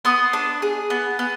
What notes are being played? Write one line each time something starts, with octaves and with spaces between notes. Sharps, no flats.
B3 C6 D#6
D4
G#4
B3
B3